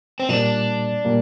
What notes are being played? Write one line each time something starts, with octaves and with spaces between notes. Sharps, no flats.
C4
A#2 G3 A#3 D4
A#2 G3 A#3